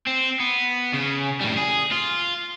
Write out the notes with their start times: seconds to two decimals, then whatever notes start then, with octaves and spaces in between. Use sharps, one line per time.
0.07 C4
0.40 B3
0.94 C#3
1.41 A2 G3
1.57 G#4
1.92 F4